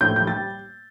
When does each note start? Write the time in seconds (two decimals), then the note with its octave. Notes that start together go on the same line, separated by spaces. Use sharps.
0.01 A2 G6
0.16 G3 G6
0.27 A6